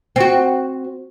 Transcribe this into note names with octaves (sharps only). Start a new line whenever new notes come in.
C4 F#4